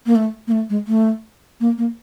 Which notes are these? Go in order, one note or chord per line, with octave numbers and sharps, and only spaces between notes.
A#3
A3
A#3
A3
G#3
A3
A#3
A#3